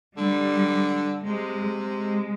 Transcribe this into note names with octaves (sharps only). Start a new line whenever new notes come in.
D3 G3
C3 G#3
G#3